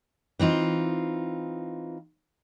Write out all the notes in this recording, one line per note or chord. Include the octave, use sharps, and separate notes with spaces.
E3 C4 D#4 F4